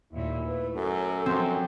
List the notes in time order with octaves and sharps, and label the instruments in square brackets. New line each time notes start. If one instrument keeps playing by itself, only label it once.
[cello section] D#2 A#2 A3 [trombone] E4
[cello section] A3 [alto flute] B4
[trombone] F#2 [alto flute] A4
[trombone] F#2 [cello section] F3 [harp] C4